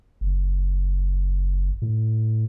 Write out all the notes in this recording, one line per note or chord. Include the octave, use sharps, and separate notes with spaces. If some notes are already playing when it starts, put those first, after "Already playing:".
F#1
A2